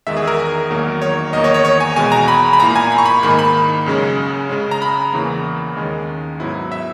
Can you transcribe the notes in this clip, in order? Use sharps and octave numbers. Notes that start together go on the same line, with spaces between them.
E2 D#3 G#3 E5
G#4
A#4
E2 D#3 F#3 A#3
C#5
E2 D#3 A#3 D#4 D#5
C#5
C#5
C#5
G#5
E2 B2 G#3 G#5
A#5
B5
B5
A#2 A#3 E4 A#5
G#5
B5
C#6
B5
G#2 D#3 A#3 B5
B5
F#2 C#3 G#3 C#4
C#3 G#3 C#4
A#5
B5
E2 C#3 E3 A#3
D#2 D#3 G#3 C#4
G#2 F#3 B3 E4
E5